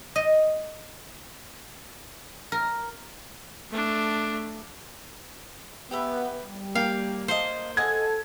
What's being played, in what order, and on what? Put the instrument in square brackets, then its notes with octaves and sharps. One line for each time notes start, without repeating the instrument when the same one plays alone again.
[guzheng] D#5
A#4
[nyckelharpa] A3 D4
[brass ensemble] B3 [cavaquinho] G4 B4 E5
[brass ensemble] G3
[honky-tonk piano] A#3 [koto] F5 [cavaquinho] G5
[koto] C5 [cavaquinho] D#5 F5 A5
[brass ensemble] A4 [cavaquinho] D#5 F#5 G#5 [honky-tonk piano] G#6